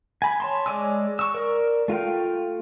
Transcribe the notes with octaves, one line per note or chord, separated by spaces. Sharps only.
G#5 B5
C#5 A5 C6
G#3 C#5 D5 G#5 E6
C#6 E6
A#4 D5
A3 F4 F5 G5